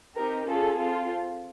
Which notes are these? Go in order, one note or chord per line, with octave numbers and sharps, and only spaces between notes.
C4 D#4 G4 A#4
C#4 F4 G#4 A4
C4 F4 A4